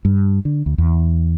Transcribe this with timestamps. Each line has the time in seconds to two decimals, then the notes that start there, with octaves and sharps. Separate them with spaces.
0.05 G2
0.45 D3
0.66 D2
0.78 E2